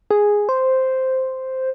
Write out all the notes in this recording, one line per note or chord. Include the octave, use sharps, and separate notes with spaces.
G#4
C5